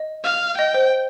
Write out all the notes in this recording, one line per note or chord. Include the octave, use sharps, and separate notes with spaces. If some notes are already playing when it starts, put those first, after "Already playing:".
Already playing: D#5
F5
D#5 G5
C5